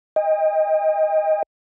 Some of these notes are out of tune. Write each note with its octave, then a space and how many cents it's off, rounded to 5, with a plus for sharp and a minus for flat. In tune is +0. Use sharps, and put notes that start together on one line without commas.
D#5 +10 G5 +40